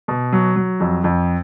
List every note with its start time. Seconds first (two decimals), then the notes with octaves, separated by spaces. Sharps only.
0.08 B2
0.32 F#3
0.56 F#3
0.80 F2
1.04 F2